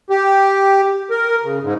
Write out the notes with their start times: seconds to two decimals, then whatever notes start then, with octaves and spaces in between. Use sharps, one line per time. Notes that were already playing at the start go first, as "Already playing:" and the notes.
0.10 G4
1.11 A#4
1.43 C#3
1.63 G#2